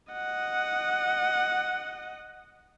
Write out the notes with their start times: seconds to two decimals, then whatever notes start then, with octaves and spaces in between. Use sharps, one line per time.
0.13 D#5 F#5